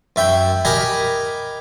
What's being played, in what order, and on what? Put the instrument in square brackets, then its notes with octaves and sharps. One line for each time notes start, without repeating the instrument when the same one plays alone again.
[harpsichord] F#2 E5 G5
G4 A#4 D#5 G#5 B5